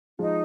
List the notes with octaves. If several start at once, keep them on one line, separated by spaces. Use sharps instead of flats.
F3 G#3 D#4 F4